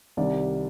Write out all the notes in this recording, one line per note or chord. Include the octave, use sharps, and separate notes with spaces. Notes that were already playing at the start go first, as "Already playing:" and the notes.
C2 C3 D#3 D5